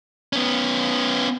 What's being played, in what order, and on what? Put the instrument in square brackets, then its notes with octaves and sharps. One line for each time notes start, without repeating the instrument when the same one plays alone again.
[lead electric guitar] B3 C#4